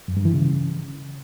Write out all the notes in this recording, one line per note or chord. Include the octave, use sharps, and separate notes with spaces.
F#2
G2
E3
C#3